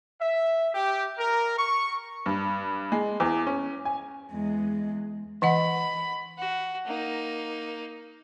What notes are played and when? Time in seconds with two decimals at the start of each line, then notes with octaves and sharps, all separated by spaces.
0.21 E5
0.74 G4
1.18 A#4
1.58 C#6
2.26 G2
2.92 G#3
3.20 E2
3.46 C#4
3.85 G#5
4.32 E2 G#3
5.42 E3 D#5 F#5 B5
6.38 F#4
6.85 A#3 D#4